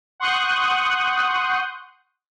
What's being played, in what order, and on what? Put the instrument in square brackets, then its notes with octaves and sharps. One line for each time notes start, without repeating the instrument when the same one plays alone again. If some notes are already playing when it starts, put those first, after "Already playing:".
[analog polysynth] F#5 C6 C#6 D#6 F#6 G6